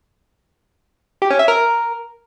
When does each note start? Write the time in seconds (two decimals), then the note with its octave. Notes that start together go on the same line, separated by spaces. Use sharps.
1.22 G4
1.30 C#4
1.39 E5
1.48 A#4